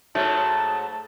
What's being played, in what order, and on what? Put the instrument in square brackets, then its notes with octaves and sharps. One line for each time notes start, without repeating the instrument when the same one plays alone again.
[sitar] G#2 F#3 [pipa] A3 [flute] A5